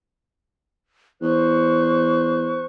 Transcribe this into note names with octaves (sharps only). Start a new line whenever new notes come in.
E2 C5 C#6 F#6